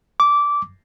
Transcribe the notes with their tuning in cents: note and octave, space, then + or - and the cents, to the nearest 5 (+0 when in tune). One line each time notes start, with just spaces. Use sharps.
D6 -15